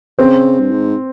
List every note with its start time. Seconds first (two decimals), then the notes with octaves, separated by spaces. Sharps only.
0.18 C#3 C4
0.60 G2
0.71 G#2